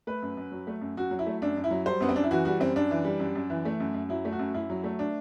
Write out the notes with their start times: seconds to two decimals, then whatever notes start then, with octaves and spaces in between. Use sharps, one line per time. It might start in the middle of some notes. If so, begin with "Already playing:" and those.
0.07 A3 B4
0.22 F#2
0.37 F#2
0.52 F#3
0.67 A3
0.81 F#2
0.97 F#2 F#4
1.11 F#3
1.19 E4
1.26 A3
1.42 F#2 D4
1.57 F#2
1.64 E4
1.71 F#3
1.85 G3 C5
2.00 F#2 B3
2.09 C4
2.16 F#2 D4
2.24 E4
2.31 E3 F#4
2.45 G3 F#4
2.60 F#2 C4
2.76 F#2 D4
2.91 E3
3.05 G3
3.19 F#2
3.35 F#2
3.50 E3
3.65 A3
3.80 F#2
3.94 F#2
4.09 F#3 E4
4.25 A3
4.32 F#4
4.39 F#2
4.54 F#2 E4
4.70 F#3
4.84 A3
4.99 D4